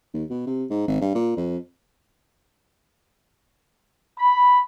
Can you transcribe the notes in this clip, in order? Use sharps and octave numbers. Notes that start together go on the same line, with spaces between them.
D#2
B2
C3
G#2
G#1
G2
A#2
F2
B5